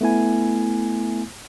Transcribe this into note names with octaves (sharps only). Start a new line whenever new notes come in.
A3 B3 E4 G#5